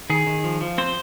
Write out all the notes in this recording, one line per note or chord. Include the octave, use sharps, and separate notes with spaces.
D#3 G#4
D#3
F3
F3
C4 C5